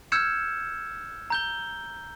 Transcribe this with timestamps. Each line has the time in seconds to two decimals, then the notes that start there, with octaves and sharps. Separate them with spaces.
0.12 E6 F6 G6 G#6 C#7 E7
1.30 A#5 G6 G7